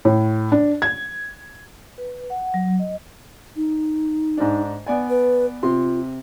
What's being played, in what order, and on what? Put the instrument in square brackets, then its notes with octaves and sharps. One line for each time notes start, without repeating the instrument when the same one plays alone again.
[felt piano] A2
D4
G#6
[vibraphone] B4
F#5
F#3
D#5
[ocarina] D#4
[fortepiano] G#2 D4
B3 D5 G#5
[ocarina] B4
[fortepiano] C3 C6 [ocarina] F4